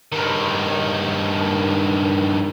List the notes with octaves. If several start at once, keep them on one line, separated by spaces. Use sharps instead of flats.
G2 D#3